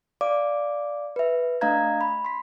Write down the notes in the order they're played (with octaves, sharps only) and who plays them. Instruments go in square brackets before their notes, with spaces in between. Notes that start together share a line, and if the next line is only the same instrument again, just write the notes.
[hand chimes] D5 F5 D6
B4 E5
A3 D4 D#5 F5 A#5 G#6
B5
C6 B6